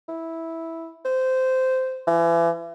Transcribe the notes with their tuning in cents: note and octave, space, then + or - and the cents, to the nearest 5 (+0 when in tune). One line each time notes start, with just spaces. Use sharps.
E4 -10
C5 -15
E3 +35